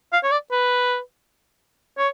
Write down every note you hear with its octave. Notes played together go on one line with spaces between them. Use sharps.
F5
C#5
D5
B4
C#5